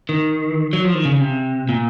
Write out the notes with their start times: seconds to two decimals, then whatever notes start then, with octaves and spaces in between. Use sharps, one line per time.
0.09 D#3
0.73 F#3
0.84 F3
0.95 D#3
1.05 C#3
1.20 C3
1.69 A#2